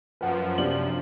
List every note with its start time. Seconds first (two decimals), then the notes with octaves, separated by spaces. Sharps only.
0.21 F#2 F3 B4 F#5
0.58 C3 D4 F#7